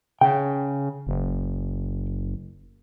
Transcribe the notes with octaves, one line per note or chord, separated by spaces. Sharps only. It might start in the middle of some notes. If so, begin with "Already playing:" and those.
C#3 G5
F#1